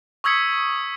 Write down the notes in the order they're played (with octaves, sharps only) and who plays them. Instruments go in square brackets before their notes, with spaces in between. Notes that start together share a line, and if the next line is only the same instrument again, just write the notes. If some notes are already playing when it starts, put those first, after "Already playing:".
[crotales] C#6 D#6 E6 G#6 B6 C#7